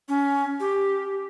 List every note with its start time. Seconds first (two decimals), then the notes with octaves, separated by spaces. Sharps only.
0.09 C#4
0.60 G4